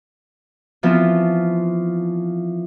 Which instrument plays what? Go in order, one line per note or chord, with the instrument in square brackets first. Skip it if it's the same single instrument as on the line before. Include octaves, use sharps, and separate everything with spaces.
[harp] E3 F3 B3 C4 F4